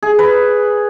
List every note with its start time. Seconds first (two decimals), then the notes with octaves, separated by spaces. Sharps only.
0.03 G#4
0.19 B4